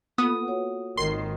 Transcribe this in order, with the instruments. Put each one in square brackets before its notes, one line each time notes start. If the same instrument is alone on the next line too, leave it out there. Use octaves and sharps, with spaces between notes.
[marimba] A#3 F4 A4 [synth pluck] B3 [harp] D#6
[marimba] F#4 C#5 F#5
[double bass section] G#1 D#3 [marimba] A#4 [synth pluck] C6 C7